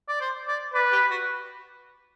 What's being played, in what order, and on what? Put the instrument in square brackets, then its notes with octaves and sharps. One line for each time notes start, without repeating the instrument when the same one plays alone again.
[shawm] D5
C5
D5
[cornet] B4 [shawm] D5
[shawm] G4
F#4